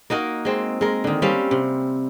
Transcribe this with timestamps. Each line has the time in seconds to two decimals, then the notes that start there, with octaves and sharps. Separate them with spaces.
0.10 A#3 D#4 F#4 A#4
0.45 G#3 C4
0.81 G#3 A#4
1.04 D3 D#3
1.22 G3 C4 C#4 F5
1.51 C3